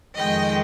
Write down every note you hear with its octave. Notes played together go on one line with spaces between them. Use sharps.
F2 D#3 G#3 D#5 G5